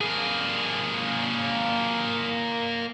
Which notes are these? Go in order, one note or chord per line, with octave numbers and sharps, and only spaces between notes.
A#3 G#4